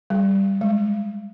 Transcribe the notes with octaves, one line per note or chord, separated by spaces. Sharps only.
G3
G#3